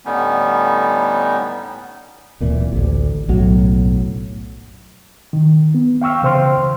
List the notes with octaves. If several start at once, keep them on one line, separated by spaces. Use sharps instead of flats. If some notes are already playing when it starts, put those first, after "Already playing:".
A2 D3 G3 B3 C#4 D#4
D1 A#2 E3
A1 D2
F#1 B1 A2 F#3
D#3
B3
F5 G5 C#6 E6 F6
C#3 E3 C5 G5 C6 F6